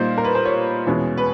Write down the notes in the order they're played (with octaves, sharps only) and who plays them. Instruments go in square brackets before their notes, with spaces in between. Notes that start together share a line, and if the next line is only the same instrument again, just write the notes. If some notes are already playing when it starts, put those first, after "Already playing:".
Already playing: [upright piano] A#2 G3 A#3 D#4 C5
A#4
B4
C5
C#5
E2 B2 G#3 C#4 E4
B4